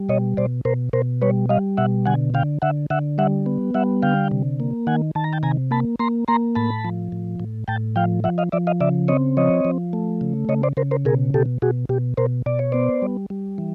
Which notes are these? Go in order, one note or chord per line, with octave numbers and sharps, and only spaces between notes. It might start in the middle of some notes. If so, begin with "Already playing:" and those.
Already playing: G3
B2 C#5 D#5
B2 C5 D5
B2 A#4 C5
B2 A#4 C5
G3 B4 C#5
G3 D#5 F5
B2 E5 F#5
D3 F#5 G#5
D3 F5 G5
D3 E5 F#5
D3 E5 F#5
G3 E5 F#5
B3
G3 E5 F#5
D3 F5 G5
C3
A#3
D#3 F#5 G#5
D#3 A5
A#5
G5 A5
C3 G#5 A#5
A#3 A5 B5
A#3 A#5 C6
A#3 A#5 C6
A2 A5 B5
F3
A2
A2
A2 G5 A5
F3 F5 G5
F3 E5 F#5
D#5 F5
F3 D5 E5
D#5 F5
C#3 D5 E5
C4 C#5 D#5
F3 C#5 D#5
F3
A3
C#3
C#3 C#5 D#5
C5 D5
C#3 A#4 C5
A#4 C5
B2 G#4 A#4
B2 G4 A4
B2 F#4 G#4
B2 G4
B2 A#4 C5
B2 D5
C#5
B3 C5 D5
G3
G3
E3